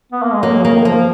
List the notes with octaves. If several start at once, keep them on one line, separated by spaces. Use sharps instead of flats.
B3
A#3
G#3
F#3 A#3
F#3
C#3 A#3
D#3
F3 A#3